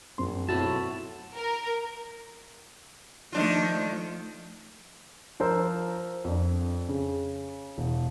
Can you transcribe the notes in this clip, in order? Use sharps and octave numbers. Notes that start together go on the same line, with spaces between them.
A#1 F#2 C4 C6
B1 A2 E4 F#4 A5
A#4
D#3 F3 A3 D4 F4
F3 A#4 C5 A#5 E6
F2 D4
C#3
E1